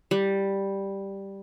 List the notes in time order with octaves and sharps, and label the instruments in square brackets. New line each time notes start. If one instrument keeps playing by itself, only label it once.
[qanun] G3